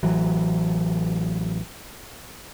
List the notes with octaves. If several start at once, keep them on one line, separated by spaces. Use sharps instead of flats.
A1 E3 F#3